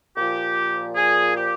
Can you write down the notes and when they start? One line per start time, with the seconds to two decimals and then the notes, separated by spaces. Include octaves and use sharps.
0.16 A#2 F3 G4
0.95 G#4
1.35 G4